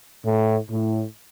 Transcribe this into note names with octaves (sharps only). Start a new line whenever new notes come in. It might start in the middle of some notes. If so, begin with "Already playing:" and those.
A2
A2